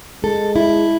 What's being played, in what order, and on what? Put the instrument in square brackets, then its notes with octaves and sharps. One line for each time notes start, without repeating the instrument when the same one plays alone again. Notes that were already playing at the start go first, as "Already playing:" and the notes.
[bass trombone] G#3 [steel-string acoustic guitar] A4
[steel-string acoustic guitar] E4